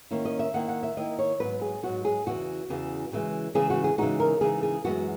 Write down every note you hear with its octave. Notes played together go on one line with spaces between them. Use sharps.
D#3 A#3 C#4 E4
D#5
E5
D#3 A#3 E4 F#5
F#5
E5
D#3 A#3 E4 D#5
C#5
G#2 F#3 B3 B4
G#4
G#2 F#3 B3 F#4
G#4
E2 C#3 E3 F#4
E2 C#3 E3
C#3 E3 G#3
C#3 E3 G#3 G#4
F#4
G#4
C#3 E3 G#3 D#4 F#4
A#4
C#3 E3 G#3 D#4 G#4
G#4
F#2 E3 G#3 B3 F#4